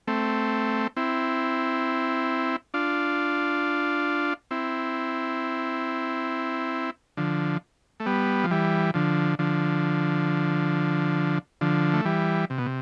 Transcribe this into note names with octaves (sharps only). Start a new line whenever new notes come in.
A3 C4
C4 E4
D4 F4
C4 E4
D3 F3
A3
G3 B3
F3
E3 G3
D3 F3
D3 F3
D3 F3
A3
E3 G3
C3
B2
C3